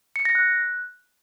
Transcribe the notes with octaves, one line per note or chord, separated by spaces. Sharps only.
C#7
A#6
F#6